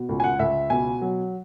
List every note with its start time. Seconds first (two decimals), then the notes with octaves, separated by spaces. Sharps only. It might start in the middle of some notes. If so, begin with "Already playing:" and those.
Already playing: B2
0.09 C#2
0.20 G#5
0.24 F#5
0.39 C#2 E5
0.70 B2 G#5
1.02 F#3